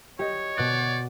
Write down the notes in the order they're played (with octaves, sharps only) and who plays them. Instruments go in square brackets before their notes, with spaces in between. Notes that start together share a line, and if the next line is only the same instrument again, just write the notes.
[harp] G4 D#5 [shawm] C#5
[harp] B2 F#6 D7 [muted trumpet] D5